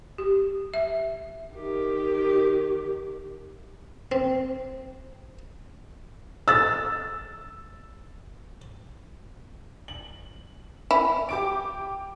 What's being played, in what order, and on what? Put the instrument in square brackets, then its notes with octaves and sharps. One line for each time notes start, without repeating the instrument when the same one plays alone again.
[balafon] G4
E5
[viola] D#3 G4
[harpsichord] C4
[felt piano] E6 A6
[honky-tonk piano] F#7
[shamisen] E4
[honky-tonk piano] G4 D6 D7